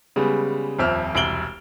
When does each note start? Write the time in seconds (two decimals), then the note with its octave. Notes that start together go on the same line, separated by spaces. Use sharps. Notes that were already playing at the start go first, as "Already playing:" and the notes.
0.16 C#3 G3 G#3 B3
0.79 D#1 F2 C4 E5 F6
1.15 E1 C2 D7 F#7 G7